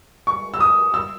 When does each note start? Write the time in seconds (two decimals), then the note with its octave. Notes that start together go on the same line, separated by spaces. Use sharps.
0.27 C#6
0.54 E6
0.60 D#6
0.94 E6